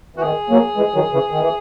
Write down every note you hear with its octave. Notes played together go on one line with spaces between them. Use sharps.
E3 F#4
D#3 G#4
F#3 A#3
E3 G#3
D#3 F#3
C#3 E3
D#3
E3